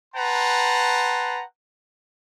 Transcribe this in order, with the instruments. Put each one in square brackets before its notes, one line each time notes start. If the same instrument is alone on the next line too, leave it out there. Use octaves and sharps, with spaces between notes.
[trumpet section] B4 F#5 G5 A5 A#5 C6